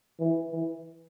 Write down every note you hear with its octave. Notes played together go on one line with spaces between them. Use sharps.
E3
E3